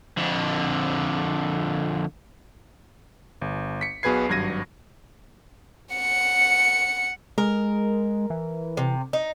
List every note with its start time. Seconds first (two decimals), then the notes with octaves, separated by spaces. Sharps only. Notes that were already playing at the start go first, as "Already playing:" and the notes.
0.17 F2 D3
3.41 G1
3.81 B6 C#7
4.03 B1 B2 G#4 B4 G#6 C7
4.29 G#1 G2 F#3 G#6 A#6 D#7
5.95 F#5 C#7
7.38 G#3 A#4
8.30 E3
8.77 C3
9.13 D#4